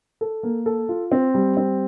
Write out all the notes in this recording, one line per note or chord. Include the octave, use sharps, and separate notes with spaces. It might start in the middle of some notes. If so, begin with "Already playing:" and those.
A4
A#3
A4
F4
C4
G3
C4